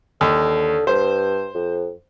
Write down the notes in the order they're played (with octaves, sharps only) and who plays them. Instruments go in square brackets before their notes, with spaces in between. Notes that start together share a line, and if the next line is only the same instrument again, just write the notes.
[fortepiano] D#2 [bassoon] D3
[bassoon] G2 [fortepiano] C5
[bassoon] F2